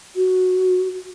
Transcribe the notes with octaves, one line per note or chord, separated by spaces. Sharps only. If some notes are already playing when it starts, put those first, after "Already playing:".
F#4